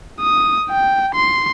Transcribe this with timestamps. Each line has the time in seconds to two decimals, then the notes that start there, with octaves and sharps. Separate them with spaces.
0.20 D#6
0.71 G5
1.15 C6